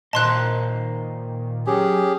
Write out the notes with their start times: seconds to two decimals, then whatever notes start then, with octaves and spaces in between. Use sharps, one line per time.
0.13 A#2 D#3 A#4 C5 D#5 A5 C6 F#6
1.67 F#3 C#4 G4 G#4